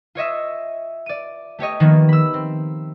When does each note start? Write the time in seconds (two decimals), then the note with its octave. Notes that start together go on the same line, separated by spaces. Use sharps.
0.15 F4 C#5 D#5 E5
1.06 D5 D#7
1.59 A3 G4 C#5 D#5
1.80 D#3 F3 A#3 B3
2.09 B5 E6
2.34 C4